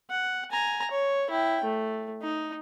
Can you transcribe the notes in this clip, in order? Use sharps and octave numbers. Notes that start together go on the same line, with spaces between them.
F#5
G#5 A#5
C#5
E4 G5
A3
D#4